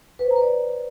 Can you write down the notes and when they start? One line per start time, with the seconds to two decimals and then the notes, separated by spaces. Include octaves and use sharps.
0.19 B4
0.25 C5
0.31 A#5
0.36 B4
0.42 D5